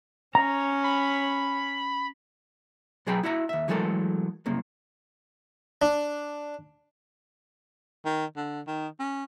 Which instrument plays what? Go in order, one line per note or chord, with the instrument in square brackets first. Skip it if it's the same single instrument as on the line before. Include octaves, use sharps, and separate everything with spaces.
[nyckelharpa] C#4 C#5 [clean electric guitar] A#5
[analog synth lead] B5
[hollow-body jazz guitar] B2 F#3 G#4 G5 A#5 B5
E4 F#4 E5 A#5
D#2 E5
E3 F#3 G#3 A3 A4 A#4
C2 F#2 C#3 A#3
[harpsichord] D4
[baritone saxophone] D#3
D3
D#3
C#4